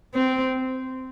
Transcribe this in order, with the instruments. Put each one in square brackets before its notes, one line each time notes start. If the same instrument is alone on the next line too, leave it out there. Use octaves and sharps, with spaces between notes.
[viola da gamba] C4